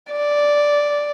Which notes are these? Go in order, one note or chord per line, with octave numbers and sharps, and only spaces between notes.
D5